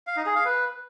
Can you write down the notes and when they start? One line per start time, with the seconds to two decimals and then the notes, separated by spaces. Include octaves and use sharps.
0.07 F5
0.17 D#4
0.26 G#4
0.36 F5
0.45 B4